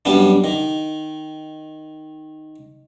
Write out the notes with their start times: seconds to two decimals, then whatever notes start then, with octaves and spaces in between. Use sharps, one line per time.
0.05 F#2 G3 B3 D4
0.44 D#3